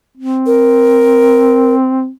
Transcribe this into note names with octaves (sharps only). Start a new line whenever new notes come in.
C4
A#4